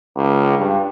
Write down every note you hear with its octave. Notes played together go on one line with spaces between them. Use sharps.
C#2
G2